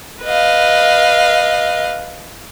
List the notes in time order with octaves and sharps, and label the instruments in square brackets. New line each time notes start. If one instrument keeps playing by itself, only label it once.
[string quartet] B4 D#5 F5